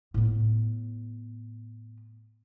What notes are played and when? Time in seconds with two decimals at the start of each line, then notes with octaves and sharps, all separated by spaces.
0.14 A2 B3